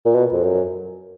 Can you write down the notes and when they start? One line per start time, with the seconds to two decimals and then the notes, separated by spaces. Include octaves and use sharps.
0.06 A#2
0.15 B2
0.33 F2
0.44 F#2